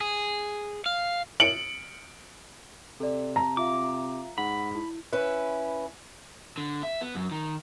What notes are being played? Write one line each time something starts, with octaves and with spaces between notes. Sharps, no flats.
G#4
F5
C#7 D7 F#7
C3 A4 D5
A5 A#5
F4 E5 F5 D6
G#2 F#5 B5
E4
C#4 E4 B4
D3
E5
B3
F#2
D#3